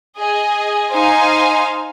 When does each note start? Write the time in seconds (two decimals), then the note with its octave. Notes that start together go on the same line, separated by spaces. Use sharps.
0.17 G#4 D#5 G#5
0.92 D#4 C5 F5 G#5